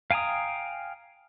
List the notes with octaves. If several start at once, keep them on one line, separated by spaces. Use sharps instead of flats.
F5 G5 G#5 A#5 D#6